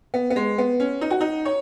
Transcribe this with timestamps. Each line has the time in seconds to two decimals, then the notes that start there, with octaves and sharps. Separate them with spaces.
0.14 B3
0.30 B3
0.36 G#3
0.58 B3
0.80 C#4
1.01 D#4
1.11 F#4
1.21 D#4
1.45 C#5